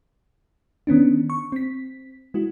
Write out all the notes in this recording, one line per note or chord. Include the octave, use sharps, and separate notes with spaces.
D#3 B3 C#4 D4
C#6
C4 B6
G#3 E4 F#4